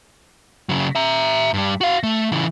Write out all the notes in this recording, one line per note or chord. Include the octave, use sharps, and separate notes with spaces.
C#3 F#3
E5 A#5
G2 G3
F#4 F5
A3
C#3 E3